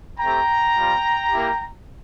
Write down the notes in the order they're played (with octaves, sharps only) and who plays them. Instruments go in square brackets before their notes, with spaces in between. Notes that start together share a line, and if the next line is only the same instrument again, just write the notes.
[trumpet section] A3 C4 G4 G5 A#5
G3 C4 F4
A#3 E4 G4